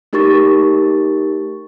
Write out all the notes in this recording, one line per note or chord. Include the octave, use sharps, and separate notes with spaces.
A3 D#4 G4 A#4 C#6 A6